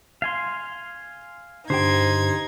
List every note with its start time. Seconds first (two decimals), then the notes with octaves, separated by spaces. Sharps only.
0.22 F5 G#5 C6
1.70 G2 D3 D#4 G4 C5 G5 G#6